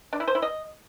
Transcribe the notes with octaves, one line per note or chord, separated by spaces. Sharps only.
D4
E4
C5
E4
D#5